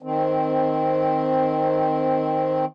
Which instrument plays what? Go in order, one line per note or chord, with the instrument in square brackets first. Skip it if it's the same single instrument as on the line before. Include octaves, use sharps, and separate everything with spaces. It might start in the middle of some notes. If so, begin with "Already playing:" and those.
[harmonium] D#3 C4